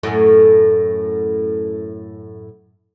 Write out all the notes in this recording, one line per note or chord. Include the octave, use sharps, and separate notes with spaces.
F#2 A2 A3